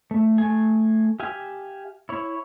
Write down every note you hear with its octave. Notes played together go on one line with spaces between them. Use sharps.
A3
A3 G#5
G4 E5 F5 G#5
E4 C#5